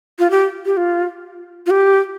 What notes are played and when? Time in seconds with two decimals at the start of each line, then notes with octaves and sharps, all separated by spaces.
0.19 F4
0.30 G4
0.65 G4
0.77 F4
1.66 F4
1.70 G4